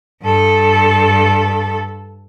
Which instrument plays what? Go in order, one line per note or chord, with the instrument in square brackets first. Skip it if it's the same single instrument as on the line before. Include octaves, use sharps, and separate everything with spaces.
[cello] G2 A4